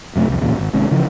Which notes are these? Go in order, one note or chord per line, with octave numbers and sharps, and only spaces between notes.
F#2 C3 E3 A3
C2 F2
D1 E2 A#2 C#3
G#1
G#1 G#2 C3 C#4
C#3 E3 F3